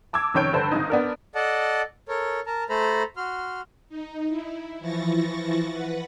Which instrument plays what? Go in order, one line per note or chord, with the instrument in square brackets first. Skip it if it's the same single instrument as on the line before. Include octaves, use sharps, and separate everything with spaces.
[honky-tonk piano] A5 D6 E6 G#6
F1 D#3 C#4 C#5 G6 D7
G2 D3 A4 B4 C5
G#1 G#2 D#4
B3 D4 A#4
[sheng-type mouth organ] A4 D5 D#5 F#5 A5
A4 A#4 C#5
A#4 A5 A#5
A3 A4 C5 A#5 B5
F#4 C6 F6
[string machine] D#4
E4
E3 F3 E4 C#6 A6 A#6
B4 F#5